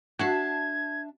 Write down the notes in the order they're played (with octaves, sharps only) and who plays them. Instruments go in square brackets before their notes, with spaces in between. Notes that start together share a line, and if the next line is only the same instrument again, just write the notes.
[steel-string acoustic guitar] D4 E5 A5 [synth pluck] F#4 F#5 C7 [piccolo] G#6